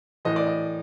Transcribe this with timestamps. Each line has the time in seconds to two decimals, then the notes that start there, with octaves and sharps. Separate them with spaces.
0.25 A2 E3 D#5
0.36 D5
0.47 D#5